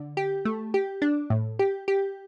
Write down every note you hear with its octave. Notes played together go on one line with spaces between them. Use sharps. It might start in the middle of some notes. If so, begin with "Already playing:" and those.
Already playing: D3
G4
A3
G4
D4
A2
G4
G4